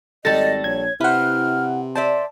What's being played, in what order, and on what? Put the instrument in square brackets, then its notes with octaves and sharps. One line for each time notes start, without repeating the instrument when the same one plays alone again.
[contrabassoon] G#1 [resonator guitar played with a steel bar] G3 F#4 A4 [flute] D#5 [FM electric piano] A6 A#6
[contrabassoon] A#1 [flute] C#5 [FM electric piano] G#6
[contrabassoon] C3 [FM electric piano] E4 F#5 [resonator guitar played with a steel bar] B4 C5 [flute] F6
[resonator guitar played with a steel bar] C5 D5 E5 [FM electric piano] A5 [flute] C6